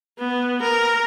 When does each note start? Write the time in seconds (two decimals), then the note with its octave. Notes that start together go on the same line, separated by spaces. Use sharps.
0.19 B3
0.62 A#4